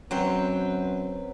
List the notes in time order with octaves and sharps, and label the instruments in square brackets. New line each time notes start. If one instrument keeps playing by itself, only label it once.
[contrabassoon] F#2 [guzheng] F#3 C4 C5 [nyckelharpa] B4